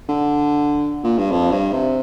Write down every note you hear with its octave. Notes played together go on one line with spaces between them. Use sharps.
D3
A#2
G2
F2
G2
C3